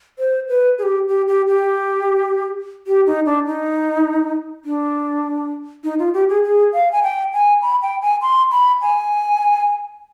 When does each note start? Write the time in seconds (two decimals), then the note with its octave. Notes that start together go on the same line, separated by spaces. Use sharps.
0.19 C5
0.49 B4
0.78 G#4
0.83 G4
1.08 G4
1.28 G4
1.48 G4
2.87 G4
3.06 D#4
3.26 D4
3.46 D#4
4.65 D4
5.84 D#4
5.99 F4
6.14 G4
6.29 G#4
6.43 G#4
6.73 F5
6.92 G#5
7.03 G5
7.33 G#5
7.62 B5
7.82 G5
8.02 G#5
8.22 C6
8.51 B5
8.82 G#5